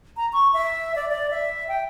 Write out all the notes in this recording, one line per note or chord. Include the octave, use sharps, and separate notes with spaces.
A#5
C#6
E5
D5
D5
E5
G5